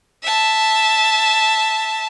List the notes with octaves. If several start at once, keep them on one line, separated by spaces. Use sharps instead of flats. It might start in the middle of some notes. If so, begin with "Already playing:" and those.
E5 A5